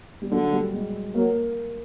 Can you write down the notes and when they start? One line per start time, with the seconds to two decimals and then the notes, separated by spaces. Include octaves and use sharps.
0.22 G3
0.31 D3 F#3
0.52 G3
0.73 G#3
1.14 F#3 A#3